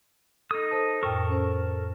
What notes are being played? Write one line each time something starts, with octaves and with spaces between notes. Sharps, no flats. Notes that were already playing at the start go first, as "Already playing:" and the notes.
D#4 A4 D#6
A4 C5 A5
F2 A2 A4 A#4 G5 C#6
C#4 C5